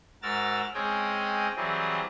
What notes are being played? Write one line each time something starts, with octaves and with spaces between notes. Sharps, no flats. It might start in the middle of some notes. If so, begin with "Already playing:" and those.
G#2 F#4 A#4 E6 F6 A6
G#3 C4 C#4 D#5 G5 G#5
E3 F#3 G3 C4 G#4 D#5